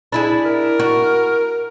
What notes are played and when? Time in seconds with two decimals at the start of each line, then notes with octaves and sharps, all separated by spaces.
0.12 D4 E4 G#4
0.45 A#4
0.80 F#4